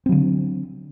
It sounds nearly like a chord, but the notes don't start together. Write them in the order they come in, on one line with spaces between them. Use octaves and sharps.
C4 F#3 D3